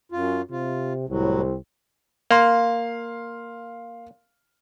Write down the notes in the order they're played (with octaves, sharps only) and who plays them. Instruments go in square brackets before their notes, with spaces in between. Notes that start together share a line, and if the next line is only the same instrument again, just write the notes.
[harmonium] F#2 F4
[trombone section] C3 [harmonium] F4
[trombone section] C2 C4 [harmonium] A2 F#3
[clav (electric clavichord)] A#3 [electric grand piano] F5 C6